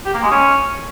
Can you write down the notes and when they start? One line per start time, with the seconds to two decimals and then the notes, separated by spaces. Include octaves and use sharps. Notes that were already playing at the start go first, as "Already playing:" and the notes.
0.05 G4
0.14 A#3
0.22 G#3
0.31 C#4